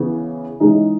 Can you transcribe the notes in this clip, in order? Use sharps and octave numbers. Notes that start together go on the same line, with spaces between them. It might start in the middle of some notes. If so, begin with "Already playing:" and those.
Already playing: C#3 E3 B3
C#3 E3 G#3 D#4